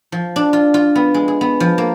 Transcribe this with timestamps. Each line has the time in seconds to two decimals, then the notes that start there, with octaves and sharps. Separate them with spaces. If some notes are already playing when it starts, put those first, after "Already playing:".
0.12 F3
0.36 D4
0.53 F4
0.74 F4
0.95 B3
1.14 G#3
1.28 G#4
1.41 B3
1.60 F3
1.78 A#3